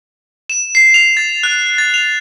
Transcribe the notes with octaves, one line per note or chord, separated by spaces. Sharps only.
E7
C7
F7
A6
F#6
A6
F7